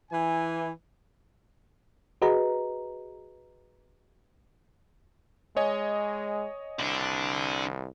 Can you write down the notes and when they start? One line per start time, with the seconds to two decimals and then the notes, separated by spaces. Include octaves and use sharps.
0.11 E3 G#5
2.22 F#4 G#4 B4 D#5 A#5
5.57 G#3 C#5 D#5 G#5
6.79 C2 D3 D4